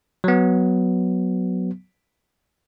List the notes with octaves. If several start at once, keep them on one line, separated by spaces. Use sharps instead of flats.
F#3 B3